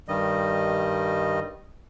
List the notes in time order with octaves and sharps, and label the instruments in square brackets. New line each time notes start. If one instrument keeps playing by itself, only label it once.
[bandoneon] G2 D#3 G3 D#5